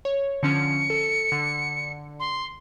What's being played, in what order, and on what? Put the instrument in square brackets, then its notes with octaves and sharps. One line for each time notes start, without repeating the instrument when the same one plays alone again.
[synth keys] C#5
[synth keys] D3 F3 C#4 [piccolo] C#7
[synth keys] A4
D3
[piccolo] C6